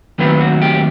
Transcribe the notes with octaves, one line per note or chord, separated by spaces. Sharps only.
D#2 D#3 F#3 A3 C4 B4
F#4
G4